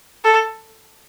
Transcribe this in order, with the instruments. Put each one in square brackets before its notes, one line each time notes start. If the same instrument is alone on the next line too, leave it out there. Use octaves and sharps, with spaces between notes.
[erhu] A4